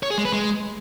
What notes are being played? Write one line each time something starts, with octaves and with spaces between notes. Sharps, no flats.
C#5
G#4
G#3
B4
G#3